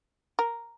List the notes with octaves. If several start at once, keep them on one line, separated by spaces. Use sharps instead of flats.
A#4